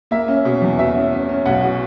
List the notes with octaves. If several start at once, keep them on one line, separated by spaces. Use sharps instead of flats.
A#3 E5
C#4
B2
E2
B2 E5
C#4
C#4
C#4
B1 F#5
B2